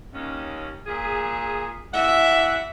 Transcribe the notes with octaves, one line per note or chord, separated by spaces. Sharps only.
D#2 C#4
A#2 G#4
E3 E5 F#5